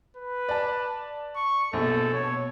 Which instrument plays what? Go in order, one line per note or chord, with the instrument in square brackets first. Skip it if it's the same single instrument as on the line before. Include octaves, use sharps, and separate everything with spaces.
[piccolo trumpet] B4
[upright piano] D5 A5
[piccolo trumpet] C#6
[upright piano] A#1 B2 [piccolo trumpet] A4
[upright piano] B2 [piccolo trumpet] C#5